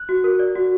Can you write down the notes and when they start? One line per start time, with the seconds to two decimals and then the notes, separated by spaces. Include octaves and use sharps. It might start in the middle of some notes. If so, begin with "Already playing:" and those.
Already playing: F#6
0.09 F#4
0.24 A#4
0.39 D5
0.55 F#4